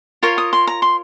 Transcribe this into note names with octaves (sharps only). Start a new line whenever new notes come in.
F4 A#4 C#5 F5
D#6
C6
A#5
C6